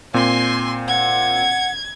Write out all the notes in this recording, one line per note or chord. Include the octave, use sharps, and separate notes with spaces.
A#2 C4 G#5 C6
F#5 G#6